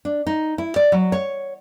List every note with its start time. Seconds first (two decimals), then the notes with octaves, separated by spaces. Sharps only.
0.05 D4
0.27 D#4
0.58 E4
0.76 D5
0.92 F#3
1.12 C#5